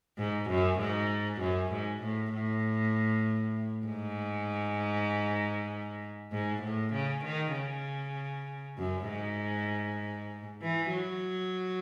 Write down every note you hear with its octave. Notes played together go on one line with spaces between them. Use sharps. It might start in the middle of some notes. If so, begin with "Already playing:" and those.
G#2
F#2
G#2
F#2
G#2
A2
A2
G#2
G#2
A2
C#3
D#3
C#3
F#2
G#2
E3
F#3